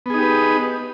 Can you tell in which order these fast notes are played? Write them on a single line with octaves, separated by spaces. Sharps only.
B3 G#4 D#4 G4 B4